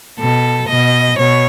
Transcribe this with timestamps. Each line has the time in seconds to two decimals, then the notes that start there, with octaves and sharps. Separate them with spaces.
0.19 B2 A4
0.68 B2 D#5
1.17 B2 C#5